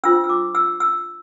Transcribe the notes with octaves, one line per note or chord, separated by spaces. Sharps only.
D4 F4 C5 E6
E6
D6
E6
E6